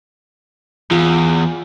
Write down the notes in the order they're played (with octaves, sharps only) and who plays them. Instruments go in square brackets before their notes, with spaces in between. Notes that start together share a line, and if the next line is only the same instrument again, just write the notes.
[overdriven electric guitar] E2 [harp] F4